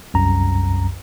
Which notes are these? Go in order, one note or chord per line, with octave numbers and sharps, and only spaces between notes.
C2 F#2 A#5